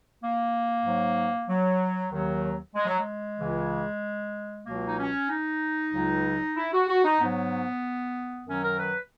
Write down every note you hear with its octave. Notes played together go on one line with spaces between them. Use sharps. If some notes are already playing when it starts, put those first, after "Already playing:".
A#3
G#2 F#3
F#3
D#2 D#3 F#3
G#3
F#3
G#3
C#2 C#3 E3
C#2 B2 F#3 A#3
D#4
C#4
D#4
C#2 C#3 F#3
E4
F#4
F#4
D#4
G#2 F#3 B3
F#2 D#3 F#3 C#4
A#4
B4